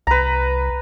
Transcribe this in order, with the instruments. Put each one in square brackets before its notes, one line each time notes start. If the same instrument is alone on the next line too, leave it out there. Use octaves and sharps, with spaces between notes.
[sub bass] C2 [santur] B4 A#5